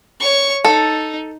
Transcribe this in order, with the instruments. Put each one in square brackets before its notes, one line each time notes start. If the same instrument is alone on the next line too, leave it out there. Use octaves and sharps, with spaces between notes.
[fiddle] C#5 C#6
[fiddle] D#4 [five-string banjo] A4